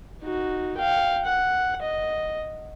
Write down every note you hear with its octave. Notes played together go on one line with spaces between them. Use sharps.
D#4 F#4
F5 G5
F#5
D#5